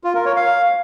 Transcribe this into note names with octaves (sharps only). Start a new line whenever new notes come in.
F4
A#4
C#5
F5